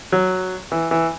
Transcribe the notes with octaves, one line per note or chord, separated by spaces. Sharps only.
F#3
E3
E3